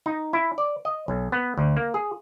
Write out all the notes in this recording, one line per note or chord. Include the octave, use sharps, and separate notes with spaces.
D#4
E4
D5
D#5
B1
B3
D2
A#3
G#4